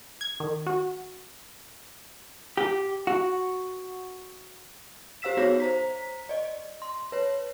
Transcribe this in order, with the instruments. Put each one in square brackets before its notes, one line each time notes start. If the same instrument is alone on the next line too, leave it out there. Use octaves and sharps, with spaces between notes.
[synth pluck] G#6
D#3
F#4
[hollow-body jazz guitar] G4
F#4
[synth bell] G4 C5 F5 E6 B6 E7
B3 D#4 F#4 G#4 C#5 A#6
C5 A#5 B6
D5 D#5
C6
B4 C#5